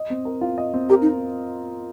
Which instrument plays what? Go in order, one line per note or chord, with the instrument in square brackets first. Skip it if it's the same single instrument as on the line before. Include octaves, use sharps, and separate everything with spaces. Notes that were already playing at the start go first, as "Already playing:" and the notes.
Already playing: [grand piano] D#5
C4
A#4
F4
D#5
C4
[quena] G4 [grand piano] A#4
[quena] D#4